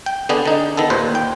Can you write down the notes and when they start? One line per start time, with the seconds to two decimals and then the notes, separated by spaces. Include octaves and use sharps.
0.06 G5
0.29 D3 B3 D4 G#4
0.46 D3 D#4
0.77 D#3 B3 A4
0.90 D#2 A#2 B4 C5
1.15 G5